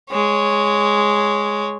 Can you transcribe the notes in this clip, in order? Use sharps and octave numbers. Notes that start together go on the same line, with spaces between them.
G#3 C#5